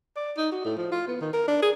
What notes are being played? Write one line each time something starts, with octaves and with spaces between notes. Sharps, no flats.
D5
D#4
F#4
A2
F3
F4
B3
D#3
A#4
D4
G#4